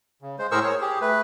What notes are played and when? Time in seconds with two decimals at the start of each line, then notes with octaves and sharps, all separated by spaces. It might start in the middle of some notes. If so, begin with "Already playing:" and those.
0.22 C#3
0.39 G#3 C5
0.52 A2 G#4 A#4 C5 C#6 E6
0.63 C#5
0.81 G4 G#4
1.02 A3 B4